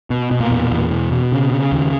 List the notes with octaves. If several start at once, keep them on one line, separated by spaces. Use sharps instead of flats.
B2
B2
A#2 A#3
E2
E2
B2
B2
C#3
C#3
D#2